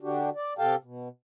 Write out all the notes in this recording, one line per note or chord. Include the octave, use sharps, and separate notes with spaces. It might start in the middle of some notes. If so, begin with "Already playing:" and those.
D3 D4 F#4 G4
D5
C3 G4 A4 F5 G5 A5
B2